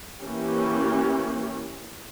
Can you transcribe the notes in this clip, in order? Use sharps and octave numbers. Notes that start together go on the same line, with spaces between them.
E3 A#3 C#4 G4